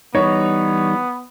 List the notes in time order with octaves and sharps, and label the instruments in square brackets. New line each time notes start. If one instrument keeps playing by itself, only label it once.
[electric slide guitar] E3 G3 D#4 [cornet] B3 [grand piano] C#5